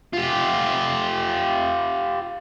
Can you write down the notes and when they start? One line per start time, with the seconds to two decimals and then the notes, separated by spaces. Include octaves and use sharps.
0.13 F4 G4